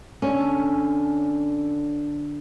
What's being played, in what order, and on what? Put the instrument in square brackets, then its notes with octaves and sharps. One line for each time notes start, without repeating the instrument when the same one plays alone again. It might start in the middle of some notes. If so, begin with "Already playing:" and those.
[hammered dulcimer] D3 A4 [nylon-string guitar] C#4